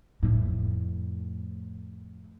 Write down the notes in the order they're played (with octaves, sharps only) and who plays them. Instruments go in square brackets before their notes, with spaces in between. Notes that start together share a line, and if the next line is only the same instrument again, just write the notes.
[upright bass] F2 A2